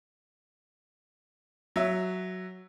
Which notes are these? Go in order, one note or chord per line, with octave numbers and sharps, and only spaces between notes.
F#3 E5